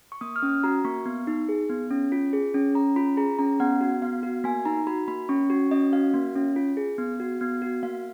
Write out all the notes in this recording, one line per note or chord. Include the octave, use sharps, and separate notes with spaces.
C#6
A#3 D#6
F6
C#4 D#6
F#4 A#5
A#3 C#6
B3
D#4
G#4
B3
C#4
F4
G#4
C#4
C#4 A#5
F4 B5
G#4 A#5
C#4 A#5
B3 F#5
F#4
B3 F5
F#4
A#3 G#5
D#4 A#5
F#4 B5
A#3 B5
C#4 C#6
F#4 C#6
C#4 D#5
F#4 F5
A#3
C#4
F4
G#4
B3
F#4
B3
F#4
A#3 F5